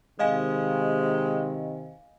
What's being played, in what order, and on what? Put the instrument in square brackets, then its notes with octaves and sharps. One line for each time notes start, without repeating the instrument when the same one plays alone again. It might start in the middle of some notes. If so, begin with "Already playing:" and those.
[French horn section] C3 D#3 [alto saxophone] G#3 [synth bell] D#5 F5 G#5